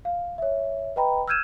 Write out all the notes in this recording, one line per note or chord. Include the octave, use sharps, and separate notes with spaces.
F5
C#5 E5
B4 D#5 G5 A#5 B5
E6 F6 G6 G#6 D#7 E7